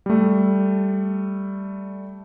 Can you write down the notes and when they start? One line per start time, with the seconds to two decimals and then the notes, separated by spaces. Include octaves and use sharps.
0.06 G3 A3